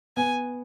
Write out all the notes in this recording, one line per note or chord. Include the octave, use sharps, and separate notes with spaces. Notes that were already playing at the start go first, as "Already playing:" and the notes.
B3 G#5